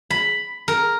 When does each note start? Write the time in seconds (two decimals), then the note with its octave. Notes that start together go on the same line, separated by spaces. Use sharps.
0.10 B5
0.68 A#4